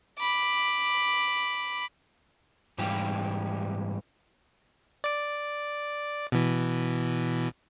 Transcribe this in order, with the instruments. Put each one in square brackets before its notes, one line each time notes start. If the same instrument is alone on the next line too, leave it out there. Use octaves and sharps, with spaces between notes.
[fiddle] B5 D6
[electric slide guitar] G#2 E3 G3 G4
[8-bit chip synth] D5 D6
B2 E3